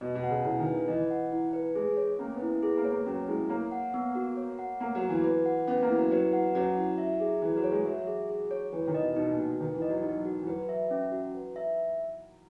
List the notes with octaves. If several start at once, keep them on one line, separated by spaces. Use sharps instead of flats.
B2 D#5
B2
F#5
C#3
C#3 E4
D#3
B4
E3 D#5
F#5
E4
B4
G#3 G#4
C#5
A#3 C#4
B3
E4
B3
B3 G#4
A#3
C#5
A#3
F#3 C#4
G#3 E4
A#3 C#5
F#5
B3
F#4
C#5
F#5
A#3 B3
F#3
F#4
E3
B4
F#5
B3 C#4
A#3
E4
F#3
F#3 B4
F#5
F#3 C#4
E4
E5
G#4
E3 G#4
F#3
C#5
G#3
F#3 E5
G#4
G#4
C#5
E3 B4
D#3
D#5
B2
B2 D#4
A#2
F#4
D#3 B4
E3
D#5
F#3
F#3 D#4
F#4
E3
F#3 B4
E5
C#4
F#4
B4
E5